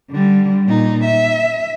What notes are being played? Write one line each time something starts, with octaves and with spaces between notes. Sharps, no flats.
D3 G3
A#2 D#4
E5